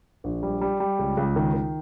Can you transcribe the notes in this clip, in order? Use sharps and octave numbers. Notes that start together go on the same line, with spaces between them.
A#1
G3
G3
G3
C#2
C#2
D#3
D#3